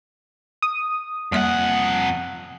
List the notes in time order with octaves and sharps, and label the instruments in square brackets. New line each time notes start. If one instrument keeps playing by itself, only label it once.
[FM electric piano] D#6
[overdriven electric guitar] F2 F#5 [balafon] G3 A#3 E5